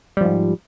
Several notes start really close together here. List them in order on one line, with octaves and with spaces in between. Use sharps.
G3 F3 G#2